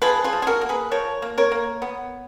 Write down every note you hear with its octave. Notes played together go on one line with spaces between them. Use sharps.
F3 G#4 B4
F4 G#4
F3
G#4
F#4 A#4
A#3
G#4 B4
F3 A#4 C#5
A#3
A#4 C#5
A#3
B3